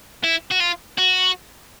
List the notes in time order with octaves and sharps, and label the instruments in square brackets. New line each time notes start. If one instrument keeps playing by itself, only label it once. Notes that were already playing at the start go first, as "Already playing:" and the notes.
[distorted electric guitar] E4
F#4
F4
F#4